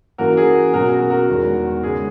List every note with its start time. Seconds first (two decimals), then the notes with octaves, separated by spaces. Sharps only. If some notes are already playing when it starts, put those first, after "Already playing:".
0.18 F#2 E3 A#3 F#4 A#4
0.37 G#4
0.74 B2 F#3 C#4 F#4 A#4
0.91 F#4 A#4
1.10 F#4 A#4
1.29 E2 D#3 G#3
1.83 F#2 C#3 G#3 G#4